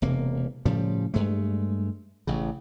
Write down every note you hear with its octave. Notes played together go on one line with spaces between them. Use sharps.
E1 C3 A#3
A2 C#3 F3 G3
G2 G#3 A3
A1 C#3